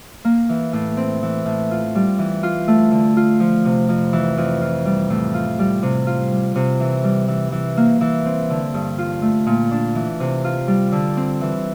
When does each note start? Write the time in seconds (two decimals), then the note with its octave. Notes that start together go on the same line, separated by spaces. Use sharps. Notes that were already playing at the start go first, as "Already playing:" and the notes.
0.25 A#3
0.49 E3
0.73 A2
0.97 C4
1.23 E3
1.46 A2
1.71 F4
1.95 G3
2.19 E3
2.43 F4
2.68 A3
2.92 D3
3.17 F4
3.40 F3
3.65 C3
3.89 F2
4.13 E3
4.38 F2
4.62 F4
4.86 G3
5.10 A2
5.34 F4
5.59 G3
5.83 C3
6.07 F4
6.32 G3
6.56 C3
6.80 E3
7.04 G3
7.28 E3
7.52 E3
7.77 A#3
8.01 E3
8.26 C4
8.50 D3
8.74 G2
8.98 F4
9.22 A3
9.47 A#2
9.71 D4
9.95 E3
10.20 C3
10.44 F4
10.68 G3
10.92 D3
11.17 C4
11.41 E3